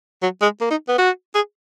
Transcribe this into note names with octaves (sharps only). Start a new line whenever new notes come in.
F#3
G#3
A#3
D#4
B3
F#4
G#4